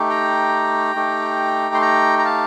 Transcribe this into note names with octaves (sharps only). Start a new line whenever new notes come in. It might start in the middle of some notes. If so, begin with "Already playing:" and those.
Already playing: A3 D#4 G4
G5 A#5
A3 D#4 G4
C6
G5 A#5
A#5
F5 A5